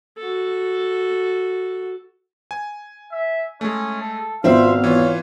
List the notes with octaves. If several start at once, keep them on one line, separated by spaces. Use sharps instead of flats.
F#4 A4
G#5
E5
G#3 A3 C#4
A4
G#1 B2 C4 F4 C5 E5 F5 E6
E3 F4 C#5